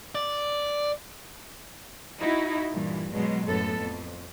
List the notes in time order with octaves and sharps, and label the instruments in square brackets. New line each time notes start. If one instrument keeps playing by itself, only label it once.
[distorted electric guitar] D5
[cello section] D#4 E4 F#4
G2 A#2 E3
B2 F#3 G#3
F#2 A2 B3 A4
F2